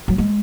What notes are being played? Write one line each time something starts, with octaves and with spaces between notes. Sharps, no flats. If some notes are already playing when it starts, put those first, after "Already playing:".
F#3
G#3